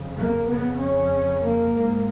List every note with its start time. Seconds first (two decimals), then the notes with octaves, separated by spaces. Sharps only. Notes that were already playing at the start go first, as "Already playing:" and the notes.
Already playing: F2 C#3
0.17 A#3
0.48 F2 C#3 B3
0.78 C#4
1.42 A#3
1.73 G#2